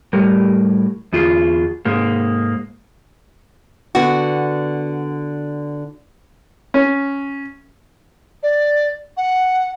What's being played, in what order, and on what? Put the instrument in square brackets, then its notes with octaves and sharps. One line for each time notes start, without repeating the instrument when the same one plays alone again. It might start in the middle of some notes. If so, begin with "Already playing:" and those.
[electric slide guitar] A2 G3 A#4
E2 F4 G#4
G#2 G#3 A#3
[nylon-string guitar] D3 B3 F#4
[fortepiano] C#4
[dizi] D5
F#5